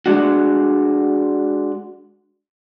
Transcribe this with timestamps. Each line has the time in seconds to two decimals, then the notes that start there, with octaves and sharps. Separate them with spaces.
0.06 G#3 D4 F#4